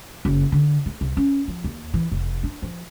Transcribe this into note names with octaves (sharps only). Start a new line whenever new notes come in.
F#1
D3
A3
C2
C#4
F3
D#2
E3
F1
D4
F3